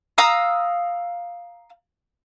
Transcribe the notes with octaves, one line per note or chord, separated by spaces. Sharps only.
F5 A#5 D#6 E6